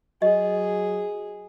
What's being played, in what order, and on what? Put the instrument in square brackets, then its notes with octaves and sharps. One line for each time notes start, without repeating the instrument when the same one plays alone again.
[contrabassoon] F#3 [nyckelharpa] G#4 [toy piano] D#5